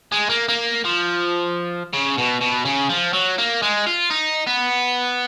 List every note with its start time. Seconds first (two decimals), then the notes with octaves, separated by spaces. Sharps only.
0.12 G#3
0.29 A#3
0.49 A#3
0.85 F3
1.93 C#3
2.18 B2
2.41 B2
2.65 C#3
2.89 F3
3.13 F#3
3.38 A#3
3.62 G#3
3.86 F4
4.10 D#4
4.47 B3